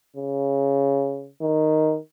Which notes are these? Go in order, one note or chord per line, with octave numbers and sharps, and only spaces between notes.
C#3
D#3